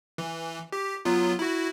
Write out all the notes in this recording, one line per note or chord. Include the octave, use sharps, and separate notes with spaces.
E3
G4
F#3 B3 F4
E4 F#4